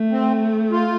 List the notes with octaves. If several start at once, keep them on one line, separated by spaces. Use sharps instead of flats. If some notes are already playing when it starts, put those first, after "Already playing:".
Already playing: A3
C4
F4